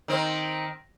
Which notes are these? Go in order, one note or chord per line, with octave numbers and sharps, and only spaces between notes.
D#3 C4